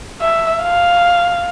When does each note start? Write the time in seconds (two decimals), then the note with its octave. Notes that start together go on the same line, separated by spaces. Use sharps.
0.21 E5
0.62 F5